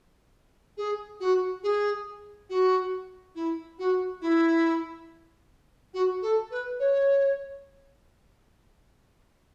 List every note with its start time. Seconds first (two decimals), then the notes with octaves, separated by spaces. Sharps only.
0.77 G#4
1.20 F#4
1.63 G#4
2.49 F#4
3.35 E4
3.79 F#4
4.21 E4
5.94 F#4
6.22 A4
6.51 B4
6.79 C#5